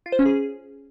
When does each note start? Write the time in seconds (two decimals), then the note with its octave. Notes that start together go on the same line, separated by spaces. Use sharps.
0.06 F4
0.12 C5
0.19 C#4
0.26 G#4